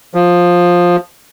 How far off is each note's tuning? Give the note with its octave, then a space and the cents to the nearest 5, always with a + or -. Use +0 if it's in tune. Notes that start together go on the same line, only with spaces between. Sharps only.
F3 +10